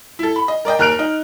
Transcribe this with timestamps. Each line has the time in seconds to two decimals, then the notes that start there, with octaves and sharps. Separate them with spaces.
0.19 E4 A4
0.36 B5
0.48 D#5
0.65 A#4 D5 D#5 G5
0.79 D#2 A#4 F6 F#6 D7 F7
0.99 D#4